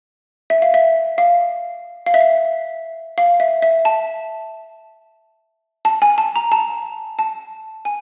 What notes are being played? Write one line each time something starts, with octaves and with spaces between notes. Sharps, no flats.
E5
F5
E5
F5
F5
E5
F5
F5
E5
E5
A5
A5
G#5
A5
A#5
A5
A5
G#5